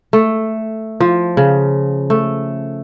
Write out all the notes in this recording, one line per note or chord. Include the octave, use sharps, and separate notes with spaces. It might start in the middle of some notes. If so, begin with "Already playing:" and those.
A3
F3
C#3
A3